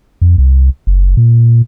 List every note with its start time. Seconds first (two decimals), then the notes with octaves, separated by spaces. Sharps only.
0.22 F2
0.38 C2
0.87 F#1
1.17 A#2